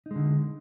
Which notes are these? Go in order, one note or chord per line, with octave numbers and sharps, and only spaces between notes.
D3 G#3 D#4